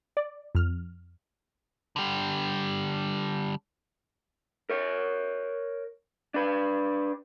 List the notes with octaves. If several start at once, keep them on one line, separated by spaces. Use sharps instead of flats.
D5
F2 F6
D3 G3
A#4 C#5
D4 B4